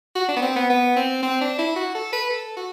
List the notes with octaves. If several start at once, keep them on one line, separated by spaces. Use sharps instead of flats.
F#4
D4
B3
C4
B3
B3
C4
C4
D4
E4
F#4
A4
B4
A4
F#4